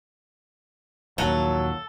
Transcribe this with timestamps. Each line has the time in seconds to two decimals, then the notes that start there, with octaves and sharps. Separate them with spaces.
1.18 A#1 D#2 F#3 F4 A4 A#4 F#5